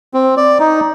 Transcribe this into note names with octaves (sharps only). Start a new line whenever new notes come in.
C4
D5
D#4